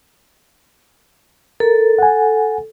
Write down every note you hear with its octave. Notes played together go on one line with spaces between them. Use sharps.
A4 A#4
F#5 G#5